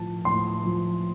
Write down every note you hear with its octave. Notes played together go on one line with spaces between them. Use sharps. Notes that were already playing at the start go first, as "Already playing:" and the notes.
Already playing: A2 F3 A5
A2 C6
F3